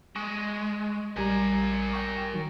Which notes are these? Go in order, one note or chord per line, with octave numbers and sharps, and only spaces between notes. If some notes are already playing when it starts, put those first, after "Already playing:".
G#3 C#6
A#1 G3 A#4 G#5 A#5
G5 C#6
D#3 F#3